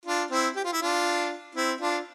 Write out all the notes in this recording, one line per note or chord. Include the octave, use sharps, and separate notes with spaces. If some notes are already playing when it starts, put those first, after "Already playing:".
D4 F4
C4 E4
G4
F4
E4
D4 F4
C4 E4
D4 F4